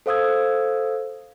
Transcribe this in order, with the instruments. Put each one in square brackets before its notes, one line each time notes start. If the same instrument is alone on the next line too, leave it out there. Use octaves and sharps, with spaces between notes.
[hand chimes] A4 C5 F5 D#6 E6 G#6